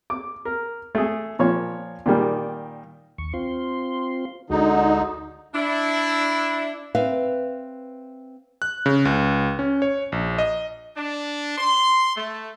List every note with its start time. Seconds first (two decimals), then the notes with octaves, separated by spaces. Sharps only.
0.10 D6
0.45 A#4
0.95 A3 G#4
1.39 A#2 F3 C#5
2.06 A#2 D#3 G3
3.18 D#2 C#6
3.34 C4 F4 C6
4.50 D2 D3 G#3 D#4 F#4
5.55 D4 E4
6.95 C4 B4 E5 F5
8.62 F#6
8.86 C#3
9.05 C#2
9.59 C#4
9.82 C#5
10.12 A#1
10.38 D#5
10.96 D4
11.57 C6
12.15 A3